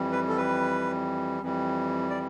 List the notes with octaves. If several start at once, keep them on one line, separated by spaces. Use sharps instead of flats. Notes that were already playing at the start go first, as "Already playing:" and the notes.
Already playing: F2 E3 G3
B4
A4
B4
F2 E3 G3
D5